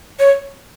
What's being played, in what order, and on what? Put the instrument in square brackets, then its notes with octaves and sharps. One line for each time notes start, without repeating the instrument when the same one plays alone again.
[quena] C#5